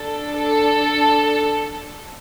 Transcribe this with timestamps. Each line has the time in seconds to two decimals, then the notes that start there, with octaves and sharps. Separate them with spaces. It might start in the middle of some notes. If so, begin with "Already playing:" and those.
Already playing: D4 A4
0.38 A4